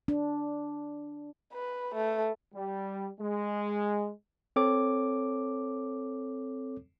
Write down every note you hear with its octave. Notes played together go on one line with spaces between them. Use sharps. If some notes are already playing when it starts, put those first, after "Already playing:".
D4
B4
A3
G3
G#3
C4 A4 C#5 D6